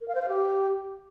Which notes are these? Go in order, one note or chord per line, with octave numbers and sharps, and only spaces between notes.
A#4
F5
C5
F5
G4